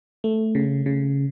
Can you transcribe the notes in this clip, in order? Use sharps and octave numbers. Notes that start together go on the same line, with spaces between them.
A3
C#3
C#3